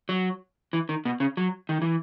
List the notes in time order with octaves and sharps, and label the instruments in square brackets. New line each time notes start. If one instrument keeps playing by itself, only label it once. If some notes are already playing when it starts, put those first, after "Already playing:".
[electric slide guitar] F#3
E3
D#3
B2
C#3
F#3
D#3
E3